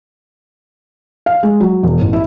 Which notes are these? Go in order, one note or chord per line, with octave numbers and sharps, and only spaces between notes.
F5
G#3
F#3
E1
A1
E4